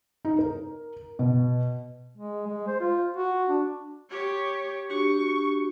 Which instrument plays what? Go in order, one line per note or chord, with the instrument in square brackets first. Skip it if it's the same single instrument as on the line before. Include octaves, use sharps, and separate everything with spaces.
[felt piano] D#4
A#4
B2
[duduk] G#3
G#3
C5
F4
F#4
D4
[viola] G4 C#5
[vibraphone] D4 F#4 G4 [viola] C#6